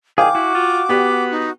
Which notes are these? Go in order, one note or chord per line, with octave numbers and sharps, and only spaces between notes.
D#3 G#4 F5 G5 G#5 D6
E4 F#4
F4
B3 G4
D#4